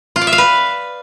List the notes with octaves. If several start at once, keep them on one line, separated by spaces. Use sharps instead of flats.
F4
D5
E5
F5
B4